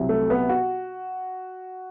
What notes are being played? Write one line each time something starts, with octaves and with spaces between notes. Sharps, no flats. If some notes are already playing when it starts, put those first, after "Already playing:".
Already playing: C2 C3 F#3
A3
B3
F#4